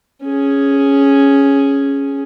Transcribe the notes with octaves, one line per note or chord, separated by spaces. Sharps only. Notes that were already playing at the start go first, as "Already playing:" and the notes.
C#4 G#4